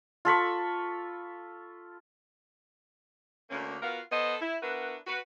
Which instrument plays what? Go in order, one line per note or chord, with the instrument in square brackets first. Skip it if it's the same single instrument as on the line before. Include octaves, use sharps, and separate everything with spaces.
[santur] F4 A4 B5 C#6
[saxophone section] D2 A#3 C#4
B3 F4 F#4 A#4 F5
B3 A4 C5 D#5
E4
B3 D4 E4 F#4 A#4 B4
F#4 B4